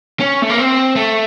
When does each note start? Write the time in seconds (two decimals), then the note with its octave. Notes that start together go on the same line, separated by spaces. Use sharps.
0.20 C#4
0.42 A3
0.49 A#3
0.58 C4
0.96 A3